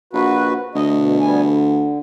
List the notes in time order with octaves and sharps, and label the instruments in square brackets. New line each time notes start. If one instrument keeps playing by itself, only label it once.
[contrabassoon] A#1 [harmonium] F#4 B4
[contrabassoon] D2 [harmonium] D#5
[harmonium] B2
G3 B3 G#5
D3